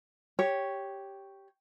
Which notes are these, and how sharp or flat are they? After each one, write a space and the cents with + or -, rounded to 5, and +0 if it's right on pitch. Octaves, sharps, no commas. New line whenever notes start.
G4 +0 C#5 +0